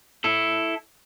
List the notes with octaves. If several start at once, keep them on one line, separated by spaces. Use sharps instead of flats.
E4 A4